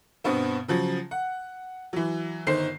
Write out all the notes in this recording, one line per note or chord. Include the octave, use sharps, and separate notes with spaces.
G2 B2 B3 C4
C#3 F3 F#3
F#5
E3 F#3
G1 D#3 C5 C7